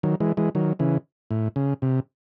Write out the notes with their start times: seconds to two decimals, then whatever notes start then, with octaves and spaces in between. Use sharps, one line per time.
0.03 D#3 F#3
0.20 E3 G#3
0.37 E3 G#3
0.55 D#3 F#3
0.79 C#3 E3
1.31 A2
1.56 C#3
1.82 C3